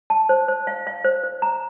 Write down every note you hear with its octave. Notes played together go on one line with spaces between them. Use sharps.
A5
C5
C5
F5
F5
C5
C5
A#5